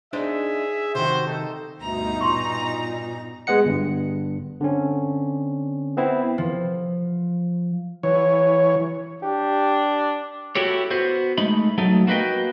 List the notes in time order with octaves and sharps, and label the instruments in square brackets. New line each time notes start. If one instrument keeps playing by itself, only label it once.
[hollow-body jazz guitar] D4 D#4 C5 [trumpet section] G#4 E5
[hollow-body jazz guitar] C3 D#3 [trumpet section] F#4 C5
[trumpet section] D#4 A4
[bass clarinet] D2 [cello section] G2 B2 D#4 [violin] A#5
[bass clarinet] A#2 [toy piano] C6 C#6
[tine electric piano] G#3 B3 D#5 F#5 C#7
G1 G2
D3 C4 C#4
B3 C4 E4
[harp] F3
[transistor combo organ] E3 C#5
[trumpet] D4 [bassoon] G4
[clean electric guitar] E4 F#4 G4 A4 C#5
B3 F#4 C5
G#3 A3 D#4 B5
F#3 A3 D#4 A4
A#3 F#4 B4 D#5 G5